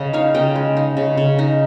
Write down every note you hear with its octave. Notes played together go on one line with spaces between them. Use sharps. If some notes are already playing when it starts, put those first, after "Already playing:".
Already playing: C#3 D#5
D#4 C#5 F5
C#3 D#5 G5
G#3
D#4
C#3
C#3
D#4